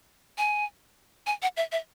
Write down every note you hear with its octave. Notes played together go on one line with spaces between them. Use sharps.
G#5
G#5
F#5
E5
E5